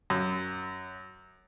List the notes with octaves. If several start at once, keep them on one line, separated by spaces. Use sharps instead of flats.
F#2